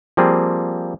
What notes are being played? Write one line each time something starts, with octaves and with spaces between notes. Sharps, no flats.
F3 G3 A#3 C4 G#4